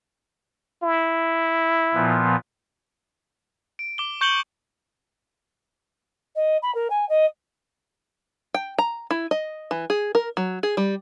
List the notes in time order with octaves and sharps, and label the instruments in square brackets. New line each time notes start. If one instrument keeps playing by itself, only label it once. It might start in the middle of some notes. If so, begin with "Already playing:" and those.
[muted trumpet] E4
[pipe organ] A#2 F3 B3
[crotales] D7
D6 G7
C#6 G6 C#7 F#7 G7
[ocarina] D#5
B5
A#4
G#5
D#5
[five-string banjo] G5
A#5
E4
D#5
E3
G#4
A#4
F#3
G#4
G3